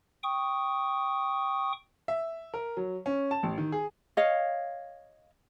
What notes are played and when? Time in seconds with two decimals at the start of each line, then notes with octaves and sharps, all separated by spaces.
0.23 G5 C#6 D#6
2.08 E5
2.54 A#4
2.77 F#3
3.06 C#4
3.31 A5
3.43 A1
3.58 D#3
3.72 G#4
4.17 C#5 D#5 F5